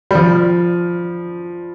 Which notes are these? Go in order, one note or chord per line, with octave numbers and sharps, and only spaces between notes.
G3
F3